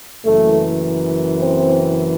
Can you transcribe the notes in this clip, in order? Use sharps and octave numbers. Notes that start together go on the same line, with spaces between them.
F#1 F#2 E3 A3
C4